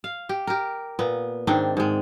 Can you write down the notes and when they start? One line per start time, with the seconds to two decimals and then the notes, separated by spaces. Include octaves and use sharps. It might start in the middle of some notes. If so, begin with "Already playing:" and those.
0.04 F5
0.29 G4
0.47 G4 A#4
0.99 A#2 B3
1.47 G#2 D#3 C4 D4
1.77 G#2 G#3